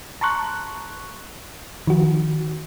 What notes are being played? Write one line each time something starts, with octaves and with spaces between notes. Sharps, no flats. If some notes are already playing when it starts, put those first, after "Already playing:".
A5 A#5 C6 C#6 F#6
D#3 F3 F#4